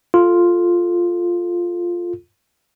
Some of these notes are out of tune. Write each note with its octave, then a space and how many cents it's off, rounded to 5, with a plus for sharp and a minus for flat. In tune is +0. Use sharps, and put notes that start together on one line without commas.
F4 +0 A4 +0